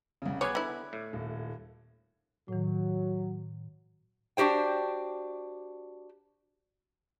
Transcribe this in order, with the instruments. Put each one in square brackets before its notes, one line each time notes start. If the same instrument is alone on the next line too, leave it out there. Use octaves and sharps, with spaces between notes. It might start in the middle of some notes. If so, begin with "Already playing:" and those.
[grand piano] C2 C#3
[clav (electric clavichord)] B3 G#4 [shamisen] C#5 [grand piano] D6 F#6 G#6
[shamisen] D3 E4
[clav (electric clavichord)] A2
[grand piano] D#1
[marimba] A2 D#3 [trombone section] F#3
[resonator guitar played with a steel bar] D4 F#4 G4 C5 G5